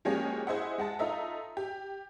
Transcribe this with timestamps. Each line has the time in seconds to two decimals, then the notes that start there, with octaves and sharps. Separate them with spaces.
0.05 F3 G#3 A#3 C#4 F#4 G4
0.47 E4 G#4 C5 D#5 E5 F#5
0.78 G#3 F#5 A5
0.99 D#4 F4 A4 D#5 E5 A#5
1.57 G4